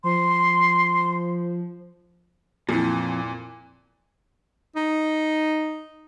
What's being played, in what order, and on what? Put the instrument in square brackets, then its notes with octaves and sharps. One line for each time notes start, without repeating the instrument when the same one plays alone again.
[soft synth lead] F3 [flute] C6
[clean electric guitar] F2 [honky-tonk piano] A#2 E3
[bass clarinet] D#4